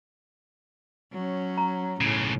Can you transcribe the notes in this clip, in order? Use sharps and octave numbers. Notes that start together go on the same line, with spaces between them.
F#3 C#4
A#5
B1 A2 C#3